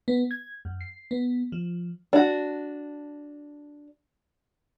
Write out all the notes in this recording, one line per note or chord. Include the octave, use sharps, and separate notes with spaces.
B3
G#6
F#2
C7
B3
F3
D4 F#4